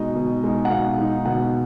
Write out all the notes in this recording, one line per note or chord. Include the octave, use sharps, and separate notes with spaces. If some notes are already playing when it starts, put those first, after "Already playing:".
Already playing: B2 G#3 D#4 D#5
B2
G#3 D#4
F#5
B2 F5
G#3 D#4
B2 F#5